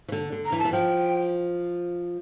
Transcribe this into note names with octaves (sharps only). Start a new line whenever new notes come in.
E3
D3
D3
A#5
E3
A5
E3
F3 G5